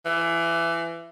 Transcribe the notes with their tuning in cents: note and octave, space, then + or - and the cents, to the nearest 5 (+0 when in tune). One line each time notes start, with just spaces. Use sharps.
E3 +25